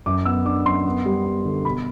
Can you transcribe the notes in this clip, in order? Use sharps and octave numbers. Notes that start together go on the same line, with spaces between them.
F#2 D6
B3 E6
D4 D6
F#2 C6
B3
G3
B3
D3
B2 B5